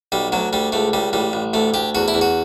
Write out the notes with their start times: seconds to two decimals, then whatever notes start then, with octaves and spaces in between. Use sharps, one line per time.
0.12 B1 G3
0.32 D2 F#3
0.53 D2 G3
0.72 C#2 A3
0.93 C#2 G3
1.13 A1 G3
1.33 A1
1.54 D2 A3
1.74 D2 G4
1.95 E2 F#4
2.08 E4
2.14 E2
2.21 F#4